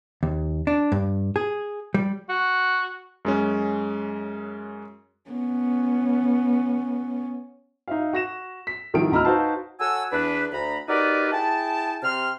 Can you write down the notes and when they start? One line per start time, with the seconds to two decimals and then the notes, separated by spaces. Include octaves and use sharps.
0.23 D#2
0.67 D4
0.92 G2
1.36 G#4
1.94 G3
2.29 F#4
3.25 F#2 G#3 C#4
5.30 B3 C#4
7.88 D#4 E5 F5
8.13 F#4 A#6 E7
8.67 B6
8.94 C2 D#3 F3 E4 D7
9.11 D2 D#5 A#5 B5 E6 F6
9.25 D#4 F#4 B4 C5 F5 A5
9.79 F#4 A4 C#5 F#5 G#5 E6
10.11 E2 D4 B4
10.52 D2 A#5 B5
10.87 D#4 F#4 G4 A#4 B4 D5
11.32 E4 G#4 G5 A5
12.03 C3 G4 C6 F6